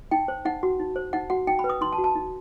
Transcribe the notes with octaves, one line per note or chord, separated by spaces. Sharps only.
D#4 G5
C5
D#4 F#5
F#4
D#4
C5
D#4 F#5
F#4 F#5
D#4 G5
B5
B4
D#6
D#4 C6
A5
F#4
A5
D#4